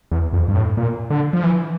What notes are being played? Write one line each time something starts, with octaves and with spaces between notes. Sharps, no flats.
E2
F2
G2
A2
A#2
D3
F3
E3